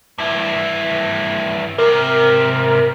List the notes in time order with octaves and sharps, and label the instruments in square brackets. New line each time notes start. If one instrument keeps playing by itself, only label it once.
[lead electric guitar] G2 E4
[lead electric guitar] G#2 C3 [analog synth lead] A#4